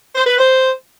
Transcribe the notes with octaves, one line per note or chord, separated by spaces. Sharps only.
C5
B4
C5